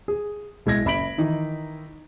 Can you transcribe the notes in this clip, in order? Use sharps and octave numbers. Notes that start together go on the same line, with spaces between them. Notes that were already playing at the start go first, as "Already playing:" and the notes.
G#4
B1 G#3 E4 G#6 A#6
F#1 E5 B5 B6 D7 F#7
D#3 E3 D#4 E4